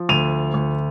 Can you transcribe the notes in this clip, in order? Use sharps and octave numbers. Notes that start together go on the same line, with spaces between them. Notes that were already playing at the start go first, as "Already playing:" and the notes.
Already playing: F3
D2 D#7 F7
D2